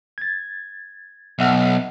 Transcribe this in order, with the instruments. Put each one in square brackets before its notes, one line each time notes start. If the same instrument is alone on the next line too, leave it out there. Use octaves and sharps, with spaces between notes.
[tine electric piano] G#6 A6
[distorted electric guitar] B1 [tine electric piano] E5 F#5